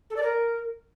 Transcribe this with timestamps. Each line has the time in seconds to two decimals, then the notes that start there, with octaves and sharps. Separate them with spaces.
0.10 A4
0.16 D5
0.23 A#4